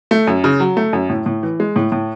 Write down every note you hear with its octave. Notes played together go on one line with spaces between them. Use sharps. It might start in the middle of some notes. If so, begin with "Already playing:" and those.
A3
F#2
C#3
F#3
A3
F#2
A2
A2
E3
G#3
A2
A2